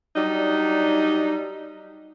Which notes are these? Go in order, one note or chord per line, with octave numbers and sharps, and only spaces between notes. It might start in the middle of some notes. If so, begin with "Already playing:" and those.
F#3 G3 D4 D#4